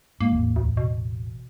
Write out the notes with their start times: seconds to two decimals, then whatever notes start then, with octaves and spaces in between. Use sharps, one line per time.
0.21 G#2 A#3
0.32 A1 E2
0.56 D2
0.77 B2